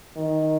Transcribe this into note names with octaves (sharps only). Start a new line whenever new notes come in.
D#3